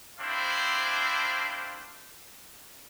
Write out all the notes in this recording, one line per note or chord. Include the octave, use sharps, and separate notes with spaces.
A3 C4 D4 E4 C5 F5